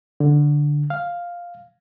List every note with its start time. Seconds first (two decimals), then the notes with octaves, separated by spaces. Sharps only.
0.20 D3
0.90 F5